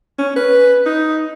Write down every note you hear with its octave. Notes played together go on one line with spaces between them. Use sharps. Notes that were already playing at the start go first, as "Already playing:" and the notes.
C#4
B4
D#4